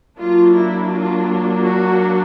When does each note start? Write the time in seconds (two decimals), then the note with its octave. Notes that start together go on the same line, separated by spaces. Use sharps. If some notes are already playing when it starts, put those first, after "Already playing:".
0.17 F#3 A#3 D4 F4
0.55 E4
0.91 F4
1.63 F#4